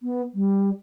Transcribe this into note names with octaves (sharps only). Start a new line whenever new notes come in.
B3
G3